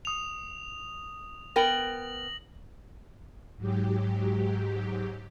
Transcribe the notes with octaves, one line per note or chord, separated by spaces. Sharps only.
D#6 F7
B3 A#4 G5 A#6 F#7
G#2 F#3 G4